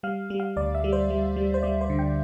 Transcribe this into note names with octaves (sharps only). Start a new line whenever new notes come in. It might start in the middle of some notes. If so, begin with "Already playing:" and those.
G3 F5
G3
F5
D2 D5
E5
G3
C5
G3
G3
C5
G3 D5
C5
D3
G5